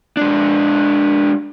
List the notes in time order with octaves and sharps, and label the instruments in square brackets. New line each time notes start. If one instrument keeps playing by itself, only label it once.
[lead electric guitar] G#3 D4